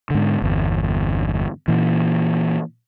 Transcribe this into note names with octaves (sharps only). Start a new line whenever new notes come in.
G#2 D3
G1 E2
A#2 E3